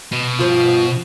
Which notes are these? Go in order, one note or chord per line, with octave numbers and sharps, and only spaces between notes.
B2
G2 F3 F4